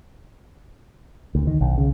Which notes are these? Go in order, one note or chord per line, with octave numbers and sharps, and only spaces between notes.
D2
D#3
B1
C#3